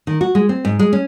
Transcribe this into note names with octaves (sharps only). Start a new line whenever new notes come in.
D#3
F#4
G#3
C4
G#2
G#3
C#4